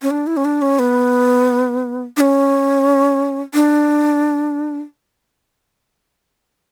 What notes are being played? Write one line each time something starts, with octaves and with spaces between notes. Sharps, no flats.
C#4
D4
E4
C#4
D4
C#4
B3
D4
C#4
D4